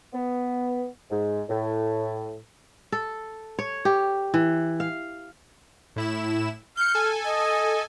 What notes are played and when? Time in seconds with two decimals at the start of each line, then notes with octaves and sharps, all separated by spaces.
0.13 B3
1.10 G#2
1.49 A2
2.92 A4
3.59 C#5
3.85 G4
4.34 E3
4.80 F5
5.96 A2 E4 E7
6.77 F6 G6 C#7
6.95 A4 G#5
7.25 D#5